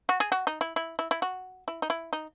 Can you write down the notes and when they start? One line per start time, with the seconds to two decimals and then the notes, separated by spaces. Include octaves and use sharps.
0.09 F#4
0.20 G#4
0.32 F#4
0.47 D#4
0.61 E4
0.76 E4
0.99 E4
1.11 E4
1.22 F#4
1.68 E4
1.82 D#4
1.90 E4
2.13 D#4